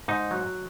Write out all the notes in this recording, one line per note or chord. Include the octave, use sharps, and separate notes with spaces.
G#2 D#4
F#3